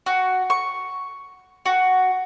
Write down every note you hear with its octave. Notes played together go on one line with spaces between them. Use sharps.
F#4
C#6
F#4